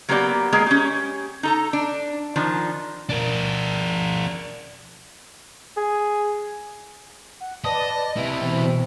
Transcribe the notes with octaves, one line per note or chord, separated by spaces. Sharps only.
F#3 A#3 B3 G4 C5 D5
G#3 A#3 B3 G#4
C#4 G4
D#4 A4 A#5
D4
D#3 F3 D4
D4 A#4
G#4
F#5
B4 D5 D#5 A5
C3 E4
B2 E3 C4